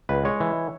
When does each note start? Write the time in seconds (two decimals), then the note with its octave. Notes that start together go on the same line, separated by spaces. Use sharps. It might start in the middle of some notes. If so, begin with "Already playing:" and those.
0.09 C#2 B4
0.25 G#3 C#5
0.40 E3